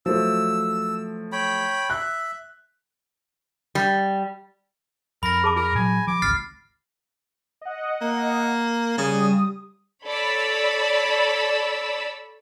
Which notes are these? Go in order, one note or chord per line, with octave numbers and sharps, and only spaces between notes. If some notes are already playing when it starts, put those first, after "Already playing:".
F3 F#3 A3 E6
C#5 G5 B5
E5 F#6
G3
F2 A#4 B5 A#6
G#4 A5 D6
F4 A#4
A#2 F#3 G#5
F3 D6
G#1 C#2 F6 A6 C7
D#5 F#5
A#3
C#3 G3 D#6
A4 C#5 D5 B5 E6